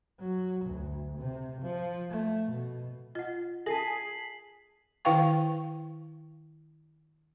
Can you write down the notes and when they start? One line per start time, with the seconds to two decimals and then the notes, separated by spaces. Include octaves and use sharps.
0.20 F#3
0.65 D2
1.18 C3
1.62 F3
2.11 A3
2.50 B2
3.15 F4 D#5 F#5
3.66 G#4 E5 A5 B6 C7 F#7
5.05 D#3 E4 B4 F5 G5 C#6